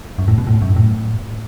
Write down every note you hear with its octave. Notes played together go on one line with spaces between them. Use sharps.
F#2
A2
B2
A2
F#2
A2